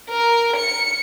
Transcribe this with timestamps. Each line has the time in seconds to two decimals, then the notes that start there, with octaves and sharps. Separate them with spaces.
0.10 A#4
0.58 C#7